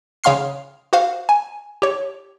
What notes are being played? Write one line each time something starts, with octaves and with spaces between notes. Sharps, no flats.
C#3 C#5 F5 C6 F6 C7
F#4 C5 F5
G#5
G4 C#5